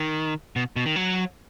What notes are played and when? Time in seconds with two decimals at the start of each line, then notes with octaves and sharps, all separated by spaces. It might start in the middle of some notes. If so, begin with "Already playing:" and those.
Already playing: D#3
0.56 B2
0.76 B2
0.86 D#3
0.96 F#3